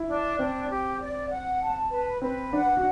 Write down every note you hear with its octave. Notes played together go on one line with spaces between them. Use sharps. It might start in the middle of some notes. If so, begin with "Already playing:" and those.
Already playing: E4
D4
C4 D4
G4
D5
F#5
A5
B4
C4 B4
D4 F#5
F#4